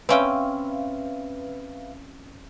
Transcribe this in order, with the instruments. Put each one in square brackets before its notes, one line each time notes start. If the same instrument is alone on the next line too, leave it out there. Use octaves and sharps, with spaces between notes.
[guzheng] C4 C#4 G5 [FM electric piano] B4 E5 F5